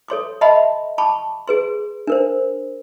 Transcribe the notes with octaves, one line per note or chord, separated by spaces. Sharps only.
A4 C#5 C6 D6
D#5 E5 F#5 A5 B5 C6
A5 B5 C#6 D6
G#4 B4 C6
D4 A#4 C5